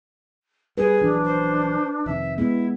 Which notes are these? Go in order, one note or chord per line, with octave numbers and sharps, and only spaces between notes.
G3 G#4 B4
A#1 E3 F#3 D4
C5
F2 C3 D#3 E5
G#3 B3 E4